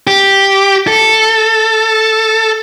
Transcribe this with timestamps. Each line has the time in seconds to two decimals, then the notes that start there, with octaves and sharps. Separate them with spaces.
0.07 G4
0.88 A4